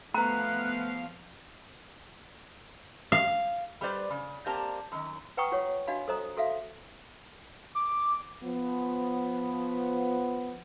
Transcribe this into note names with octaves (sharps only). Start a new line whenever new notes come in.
F3 A3 B3 B4 F5 A#5 F#6
F5
G3 G4 B4 C5 D5
C#3
A#3 C4 G4 D5 A5 A#5
F#2 D#3
B4 F#5 G5 A#5 C#6 D#6
F4 G4 C#5 F#5
D4 F#4 D#5 F5 B5
A4 C5 D#5 A#5 D#6
F#4 A4 E5 F5
D6
F3 B3